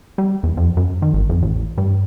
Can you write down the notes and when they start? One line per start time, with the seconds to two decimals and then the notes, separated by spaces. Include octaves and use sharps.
0.18 G3
0.43 E2
0.57 F2
0.77 F#2
1.02 D#3
1.13 G#1
1.29 F2
1.42 A1
1.78 G2